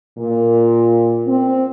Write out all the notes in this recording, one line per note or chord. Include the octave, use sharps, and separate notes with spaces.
A#2
C4